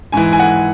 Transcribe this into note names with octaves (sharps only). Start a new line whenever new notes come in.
G#2 E3 G#5
G#5
F#5